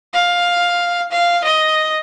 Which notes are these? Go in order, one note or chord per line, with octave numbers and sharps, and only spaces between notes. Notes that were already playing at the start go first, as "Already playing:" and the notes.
F5
F5
D#5